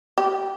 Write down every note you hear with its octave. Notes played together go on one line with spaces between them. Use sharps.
G4